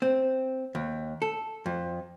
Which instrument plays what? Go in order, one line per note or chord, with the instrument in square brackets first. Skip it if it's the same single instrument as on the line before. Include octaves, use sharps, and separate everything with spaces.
[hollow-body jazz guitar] C4
D#2
A4
F2